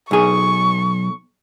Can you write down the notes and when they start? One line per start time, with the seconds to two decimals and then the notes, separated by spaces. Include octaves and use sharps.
0.11 B1 G#4 C#6